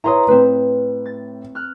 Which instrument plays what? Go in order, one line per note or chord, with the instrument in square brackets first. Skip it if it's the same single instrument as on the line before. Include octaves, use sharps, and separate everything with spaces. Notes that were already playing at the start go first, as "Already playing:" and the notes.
[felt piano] E4 B4 C#5 [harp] A#5 C6 D#6
[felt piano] A2 [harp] C4 B4
[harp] A6
F6 F#6